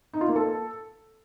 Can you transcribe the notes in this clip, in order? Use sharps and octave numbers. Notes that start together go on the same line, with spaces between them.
D#4
F4
A#3
A4